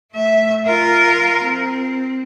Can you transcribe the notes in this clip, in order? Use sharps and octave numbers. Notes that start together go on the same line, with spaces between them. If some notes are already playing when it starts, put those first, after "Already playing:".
A3 E5
F4 A#4
C4